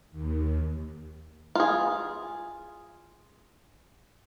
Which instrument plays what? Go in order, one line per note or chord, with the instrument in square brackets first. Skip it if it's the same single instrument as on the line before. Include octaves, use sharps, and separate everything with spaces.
[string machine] D#2
[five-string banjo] F4 G#4